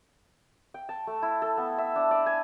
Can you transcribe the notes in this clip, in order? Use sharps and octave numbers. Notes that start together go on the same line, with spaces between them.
G5
A5
A3
E4
A4
B3
E5
D4
D5
G#5